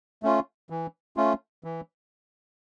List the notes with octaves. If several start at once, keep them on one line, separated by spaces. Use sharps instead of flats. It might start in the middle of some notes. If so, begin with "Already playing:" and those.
A3 C#4 F4
E3
A3 C#4 F4
E3